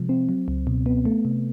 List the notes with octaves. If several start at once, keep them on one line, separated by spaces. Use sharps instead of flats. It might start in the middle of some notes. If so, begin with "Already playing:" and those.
Already playing: C3 F3 G#3
C4
F#3
C#2
B2
B3
A3
C3